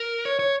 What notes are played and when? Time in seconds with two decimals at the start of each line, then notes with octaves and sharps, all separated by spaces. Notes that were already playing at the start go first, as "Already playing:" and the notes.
Already playing: A#4
0.25 C#5
0.39 C#5